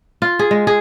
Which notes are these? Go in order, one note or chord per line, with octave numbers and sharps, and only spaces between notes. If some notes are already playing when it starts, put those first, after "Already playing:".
F4
G#4
G#3
G#4